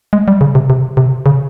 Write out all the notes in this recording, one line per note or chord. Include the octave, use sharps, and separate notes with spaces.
G#3
G3
C#3
C3
C3
C3
C#3